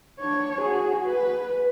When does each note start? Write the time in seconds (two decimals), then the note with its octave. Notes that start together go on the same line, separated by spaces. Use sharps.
0.19 D4 C#5
0.61 F#4 G#4
1.05 B4